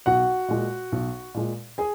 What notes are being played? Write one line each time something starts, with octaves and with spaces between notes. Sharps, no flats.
B1 F#4 F#5
A#2 G#3
B1
A#2 G#3
G#4 G#5